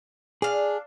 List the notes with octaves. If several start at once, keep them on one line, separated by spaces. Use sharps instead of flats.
D4 G#4 F5